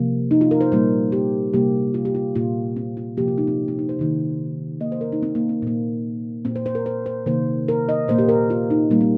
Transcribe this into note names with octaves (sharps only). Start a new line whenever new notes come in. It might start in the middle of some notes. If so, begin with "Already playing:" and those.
Already playing: C3 F3 A#3
D#4
F4
A#4
C5
A#2 G3 A#3 C5
G4
C3 G3 A#3 G4
F4
G4
F4
A#2 A#3 F4
C4
F4
C3 F3 A#3 G4
F4
D#4
C4
C4
D#4
C5
C3 D#3 A#3
D#3 A#3 D#5
C5
A#4
D#4
C4
A#3
C4
A#2 A#3
A#2 A#3 C4
C5
C5
A#4
C5
C5
C3 D#3 A#3 C5
A#4
D#5
A#2 A#3 C5
G4
A#4
F4
D#4
A#2 G3 A#3
C4